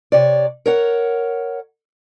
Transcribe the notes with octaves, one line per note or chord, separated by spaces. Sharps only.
C3 C#5 D5
A#4 C#5 F#5